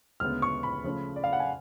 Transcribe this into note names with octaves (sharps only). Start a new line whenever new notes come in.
D2 C#3 G#3 B3 F6
C#6
B5
C#3 F3 A3 C#4
D5
F5
F#5
G#5